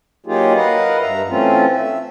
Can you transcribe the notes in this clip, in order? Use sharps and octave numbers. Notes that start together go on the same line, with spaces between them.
F#3 A#3 D#4 F4 G4 G#4
A#4 B4 D#5 F5 F#5
G2 E5 A#5
E3 A3 C4 C#4 F4
E5